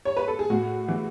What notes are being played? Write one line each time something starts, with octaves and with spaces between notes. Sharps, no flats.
C#5
B4
A4
G#4
A2 F#4
E3